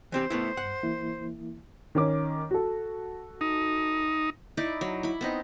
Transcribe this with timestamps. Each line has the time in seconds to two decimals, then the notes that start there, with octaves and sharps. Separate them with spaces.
0.12 E3 C4 G4 C5
0.30 A3 B3 E4
0.57 G2 F#5
0.83 E3 A#3 E4
1.95 D#3 C#4 D6
2.51 F#4 A4
3.41 D#4
4.57 D#4 E4 D5
4.81 F#3
5.03 E4 B5
5.21 B3 C4 D#4